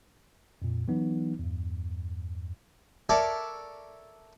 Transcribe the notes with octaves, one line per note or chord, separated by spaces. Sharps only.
F2 A#2
E3 F#3 B3 D#4
E2 G2
A4 A#4 C#5 D5 E5 A5